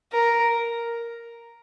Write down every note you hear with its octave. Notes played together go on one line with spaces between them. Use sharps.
A#4